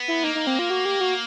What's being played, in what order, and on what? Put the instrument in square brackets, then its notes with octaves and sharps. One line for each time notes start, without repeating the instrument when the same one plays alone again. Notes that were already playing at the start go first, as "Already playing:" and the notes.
Already playing: [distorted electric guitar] B3
[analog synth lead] E4
[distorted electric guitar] A#3 [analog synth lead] D#4
[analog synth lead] D#4
C4
F4
F#4
G4
F#4